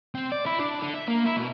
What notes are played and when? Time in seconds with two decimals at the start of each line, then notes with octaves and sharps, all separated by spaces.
0.15 C4
0.32 D5
0.46 E4
0.59 D4
0.82 D3
0.94 E5
1.08 A#3
1.25 E4
1.37 B2